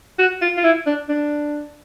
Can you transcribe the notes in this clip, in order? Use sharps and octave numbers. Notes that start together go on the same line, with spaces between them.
F#4
F4
F4
E4
D4
D4